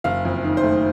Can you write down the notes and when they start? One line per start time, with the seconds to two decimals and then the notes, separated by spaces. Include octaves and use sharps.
0.04 F#1 F5
0.25 F2
0.44 D#3
0.57 C5
0.63 A3